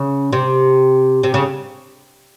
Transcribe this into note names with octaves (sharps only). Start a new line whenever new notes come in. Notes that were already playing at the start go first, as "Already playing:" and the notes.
Already playing: C#3
C3
C3
C#3